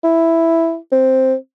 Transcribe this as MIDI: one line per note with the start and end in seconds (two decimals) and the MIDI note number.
0.04 0.76 64
0.92 1.34 60